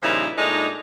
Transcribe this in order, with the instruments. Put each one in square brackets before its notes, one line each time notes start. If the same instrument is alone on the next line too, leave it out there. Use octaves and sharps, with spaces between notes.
[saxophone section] A#2 C#3 F3 G3 D#4 E4
A#2 G#3 A3 D4 D#4